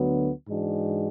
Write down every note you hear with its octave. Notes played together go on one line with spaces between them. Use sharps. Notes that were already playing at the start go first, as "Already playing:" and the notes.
Already playing: D2 D3 F#3 B3
G#2 E3 G#3 D4 F#4